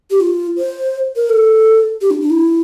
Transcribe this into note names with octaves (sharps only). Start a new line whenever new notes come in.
G4
F4
C5
A#4
A4
G4
D4
D4
E4